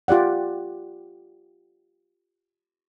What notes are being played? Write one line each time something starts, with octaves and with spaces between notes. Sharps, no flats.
F4 G4 D5 F#5